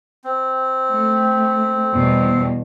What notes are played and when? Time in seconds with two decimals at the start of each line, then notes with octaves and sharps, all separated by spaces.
0.24 C4
0.90 A3
1.94 E2 B2 G3